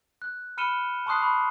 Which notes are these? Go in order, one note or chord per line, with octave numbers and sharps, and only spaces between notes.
F#6
B5 F6 C#7 D#7 E7 G7
A5 C6 C#6 D#6 F#6 C7
B5 C#6